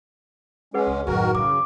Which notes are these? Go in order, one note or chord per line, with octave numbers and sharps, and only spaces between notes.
G#3 C#4 G#4 B4 F#5
C#2
F#2 A2 D#3 F#4 A#4
C#3 E3 D6